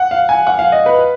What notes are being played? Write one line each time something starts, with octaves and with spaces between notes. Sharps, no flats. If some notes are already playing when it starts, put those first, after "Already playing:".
Already playing: F#5
F5
G#5
F#5
F5
D#5
B4